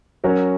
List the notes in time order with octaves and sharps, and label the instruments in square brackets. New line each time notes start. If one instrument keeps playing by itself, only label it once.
[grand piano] F#3 C#4 F#4 A#4 C#5